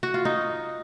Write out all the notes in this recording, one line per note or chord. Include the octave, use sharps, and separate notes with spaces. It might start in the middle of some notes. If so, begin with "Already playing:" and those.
F#4
F4
D#4